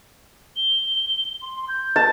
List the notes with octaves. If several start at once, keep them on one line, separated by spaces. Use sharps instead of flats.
G7
C6
G6
A5